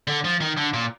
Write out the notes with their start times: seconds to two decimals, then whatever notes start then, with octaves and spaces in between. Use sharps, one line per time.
0.07 D3
0.24 F3
0.40 D#3
0.57 D3
0.73 A#2